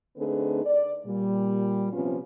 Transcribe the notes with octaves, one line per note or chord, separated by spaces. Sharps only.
D3 A3 C4 D#4 G#4 B4
D5
A#2 G3
C3 F3 B3 C#4 F4